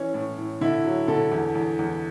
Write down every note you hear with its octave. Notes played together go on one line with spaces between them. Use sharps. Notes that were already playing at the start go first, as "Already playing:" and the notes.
Already playing: E3 C#4
A2
A2
D3 E4
F#3
D3 A4
E2
E2
E2